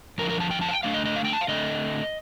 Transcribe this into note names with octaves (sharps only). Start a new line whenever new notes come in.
F2 D3 F3 A#4
A#4
A5
G5
A5
F5
G5
D3 A3 D4 F5
D#5
D#5
F5
G5
A5
F5
D3 A3 C4 D#5